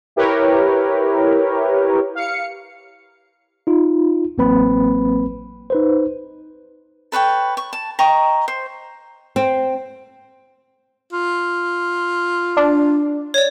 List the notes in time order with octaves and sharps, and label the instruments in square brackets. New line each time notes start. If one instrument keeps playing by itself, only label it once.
[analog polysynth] E4 G4 A#4 B4 C#5
F5 C#7
[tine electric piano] D#4 F4
A1 F#3 A#3 C4 B4 B5
D#4 B4 C5
[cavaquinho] A4 B4 C#5 G5
C#6
A5
D#5 G5 A#5 C#6
C5
[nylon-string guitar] C4
[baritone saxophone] F4
[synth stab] D4
[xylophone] C#5 D5